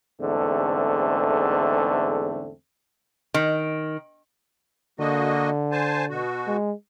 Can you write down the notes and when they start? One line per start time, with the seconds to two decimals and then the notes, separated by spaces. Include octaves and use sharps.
0.21 E2 G#2 D3 A3 C4
3.34 D#3
5.00 D3 A#3 F#4 D#5
5.72 C5 G#5 A5
6.10 B2 F#4
6.47 G#3